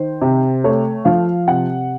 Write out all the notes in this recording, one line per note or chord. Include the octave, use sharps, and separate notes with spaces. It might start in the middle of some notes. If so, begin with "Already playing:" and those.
Already playing: D#3 C5
C3
A3 C#5
F3 F5
C3 F#5